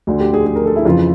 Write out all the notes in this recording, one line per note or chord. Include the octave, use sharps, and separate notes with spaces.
D2 D3
G4
G#4
G#4
A#4
A4
E4
F2 C#3 E3 F4